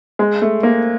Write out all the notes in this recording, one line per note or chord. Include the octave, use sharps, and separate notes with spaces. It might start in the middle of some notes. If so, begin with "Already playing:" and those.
G#3
A3
A#3